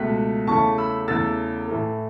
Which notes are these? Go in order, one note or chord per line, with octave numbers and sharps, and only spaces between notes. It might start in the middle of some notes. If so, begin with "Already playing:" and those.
Already playing: C#2 B2 A3 F#6 B6
E2 C#3 A3 A5 C#6
B5 E6
E2 C#3 A3 E6 A6
A2 E3 A3